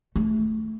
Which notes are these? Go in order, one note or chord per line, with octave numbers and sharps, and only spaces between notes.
A3